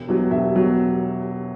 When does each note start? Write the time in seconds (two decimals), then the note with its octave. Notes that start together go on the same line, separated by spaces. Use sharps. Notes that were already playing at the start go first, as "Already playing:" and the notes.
Already playing: E1
0.08 E2 B2 F#3
0.31 E1 E5
0.55 B2 F#3